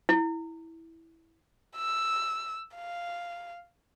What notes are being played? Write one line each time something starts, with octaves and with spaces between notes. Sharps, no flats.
E4
E6
F5